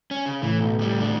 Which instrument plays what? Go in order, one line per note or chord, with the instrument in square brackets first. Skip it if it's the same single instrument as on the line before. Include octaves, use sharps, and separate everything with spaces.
[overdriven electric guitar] C#4
C#3
[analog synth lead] A2 [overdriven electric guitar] E3
[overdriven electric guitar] B1
C#2 G3
D#2 D4